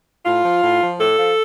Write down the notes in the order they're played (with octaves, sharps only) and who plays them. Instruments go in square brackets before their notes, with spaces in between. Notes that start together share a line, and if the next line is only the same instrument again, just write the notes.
[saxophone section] A2 F4
F3
A2
F3
A2 A4
F3